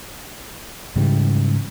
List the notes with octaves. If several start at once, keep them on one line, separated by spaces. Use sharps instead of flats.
G#2 C#3 E3 G3